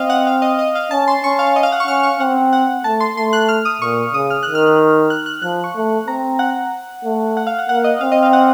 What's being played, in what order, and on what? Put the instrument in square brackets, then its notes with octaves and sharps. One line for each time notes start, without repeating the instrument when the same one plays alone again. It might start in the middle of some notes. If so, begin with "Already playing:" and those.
Already playing: [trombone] C4 [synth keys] D#5 F5
[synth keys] F#5
F5
D#5
D#5
F5
[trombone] C#4 [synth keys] A5
[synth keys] C6
[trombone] C#4 [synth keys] C#6
[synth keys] F5
D#5
F5
F#5
C#6
[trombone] C#4 [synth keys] F6
[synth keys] C#6
[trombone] C4 [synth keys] F#5
[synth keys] F#5
[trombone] A3 [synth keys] A5
[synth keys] C6
[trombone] A3 [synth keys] C6
[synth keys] F#6
F6
D#6
[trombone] A#2 [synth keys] C#6
[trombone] C#3 [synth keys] D#6
[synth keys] F6
[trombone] D#3 [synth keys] F#6
[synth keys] F6
F#6
F#6
[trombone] F3 [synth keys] F#6
[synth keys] C#6
[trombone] A3
[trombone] C4 [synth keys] A#5
[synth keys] F#5
[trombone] A3
[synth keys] F#5
F5
F#5
[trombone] A#3 [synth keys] F#5
[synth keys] D#5
[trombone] C4 [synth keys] F5
[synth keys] D#5
F5
F#5